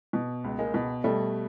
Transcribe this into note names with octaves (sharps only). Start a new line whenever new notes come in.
B2
C#2
G#3 A#3
B2
B2 G3 A3